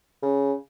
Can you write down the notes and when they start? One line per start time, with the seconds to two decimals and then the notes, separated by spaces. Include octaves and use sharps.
0.23 C#3